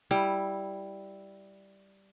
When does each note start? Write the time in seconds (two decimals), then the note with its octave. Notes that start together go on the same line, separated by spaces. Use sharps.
0.11 G3 E4